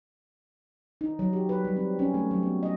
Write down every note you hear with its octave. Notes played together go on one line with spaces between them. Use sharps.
D#4
F#3
G4
B4
G3
C4
C#4
A3
F#3
B3
D#5